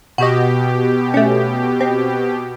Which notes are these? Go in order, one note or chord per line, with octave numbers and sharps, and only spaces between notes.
B2 F#4 G4 D#5
A3 C#4
C4